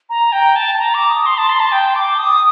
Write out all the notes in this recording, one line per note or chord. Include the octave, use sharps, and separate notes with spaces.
A#5
G5
A5
A5
A#5
D6
D#6
C6
A5
C6
A5
G5
D6
D#6